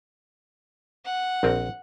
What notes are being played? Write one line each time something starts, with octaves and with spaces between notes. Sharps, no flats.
F#5
A#1 C4 A#4